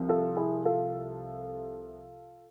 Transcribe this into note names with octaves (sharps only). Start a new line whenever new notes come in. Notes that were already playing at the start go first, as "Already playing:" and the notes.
Already playing: C2 C3 F3
F4 A4
E4 G#4
F4 A4